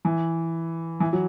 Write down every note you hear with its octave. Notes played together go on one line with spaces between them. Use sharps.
E3
E3
F#3